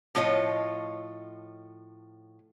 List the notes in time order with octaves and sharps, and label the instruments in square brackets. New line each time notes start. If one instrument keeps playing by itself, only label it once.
[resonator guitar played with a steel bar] A2 F3 F4 C#5 D#5